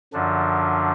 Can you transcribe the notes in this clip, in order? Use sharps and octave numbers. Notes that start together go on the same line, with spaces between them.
F#2 D3 F3 D4